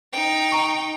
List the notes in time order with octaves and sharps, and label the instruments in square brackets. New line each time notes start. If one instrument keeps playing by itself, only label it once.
[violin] D#4 G5
[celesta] A#5 C#6